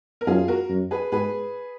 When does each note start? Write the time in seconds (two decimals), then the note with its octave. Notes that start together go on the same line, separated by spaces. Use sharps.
0.21 A#4
0.27 F#2 F4 G#4
0.48 F#4 A#4
0.70 F#2
0.91 G#4 B4
1.12 G#2 G#4 B4